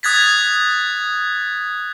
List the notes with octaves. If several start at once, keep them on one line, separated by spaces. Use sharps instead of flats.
D#6 F#6 G#6 A6 B6